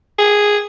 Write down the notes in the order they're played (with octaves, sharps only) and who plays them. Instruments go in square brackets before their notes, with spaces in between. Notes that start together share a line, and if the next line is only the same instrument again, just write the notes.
[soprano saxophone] G#4